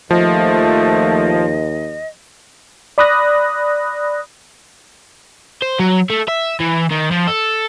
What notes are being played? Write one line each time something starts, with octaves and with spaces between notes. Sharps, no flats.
D#2 F3 A3 D#5
D5 B5 D#6 F#6 A#6
C5
F#3
A3
E5
E3
D#3
F3
A4